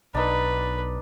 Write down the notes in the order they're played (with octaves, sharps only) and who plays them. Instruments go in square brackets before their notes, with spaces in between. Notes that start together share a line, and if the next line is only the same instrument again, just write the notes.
[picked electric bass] B1 [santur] D4 D#4 [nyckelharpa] B4